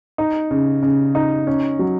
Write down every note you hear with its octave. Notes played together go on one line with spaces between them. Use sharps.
D#4
C#3
C#3
D#4
C#4
F#3